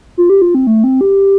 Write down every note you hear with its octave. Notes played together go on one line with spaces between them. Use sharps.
F4
G4
F4
C4
A3
C4
G4